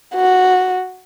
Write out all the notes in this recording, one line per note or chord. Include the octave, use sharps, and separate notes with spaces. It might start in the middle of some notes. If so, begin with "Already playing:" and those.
F#4